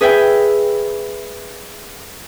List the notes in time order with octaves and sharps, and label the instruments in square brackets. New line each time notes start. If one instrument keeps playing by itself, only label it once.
[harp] G#4 B4 E5 G5 G#5